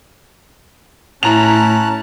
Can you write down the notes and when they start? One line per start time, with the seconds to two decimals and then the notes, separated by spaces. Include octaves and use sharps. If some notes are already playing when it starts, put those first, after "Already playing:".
1.23 A2 C#4 E4 A5 A#5 F#6 F7